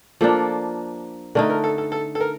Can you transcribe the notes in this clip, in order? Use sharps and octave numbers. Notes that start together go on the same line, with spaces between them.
F3 A#3 D4 A4
D3 A3 D#4 A#4
A#4
A4
A4
A4
A4
A#4